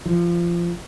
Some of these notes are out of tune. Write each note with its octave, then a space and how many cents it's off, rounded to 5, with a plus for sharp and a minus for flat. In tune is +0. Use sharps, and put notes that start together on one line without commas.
F3 -20